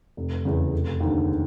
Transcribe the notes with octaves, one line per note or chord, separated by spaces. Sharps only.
F1
E2 C#3
F1
D#2 D3